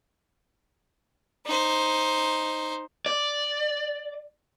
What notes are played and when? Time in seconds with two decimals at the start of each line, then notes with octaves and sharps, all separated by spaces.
1.46 D#4 C5
3.06 D5